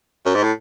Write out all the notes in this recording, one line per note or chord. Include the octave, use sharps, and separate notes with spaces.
F#2
G#2
A2